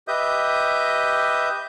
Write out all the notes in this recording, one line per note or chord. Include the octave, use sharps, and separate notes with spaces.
G4 B4 D#5 E5 D#6 G6